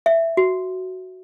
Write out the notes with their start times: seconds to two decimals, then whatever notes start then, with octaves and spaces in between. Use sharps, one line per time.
0.06 E5
0.37 F#4